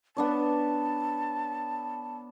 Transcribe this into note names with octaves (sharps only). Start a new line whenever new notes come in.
B3 D4 C#5 A5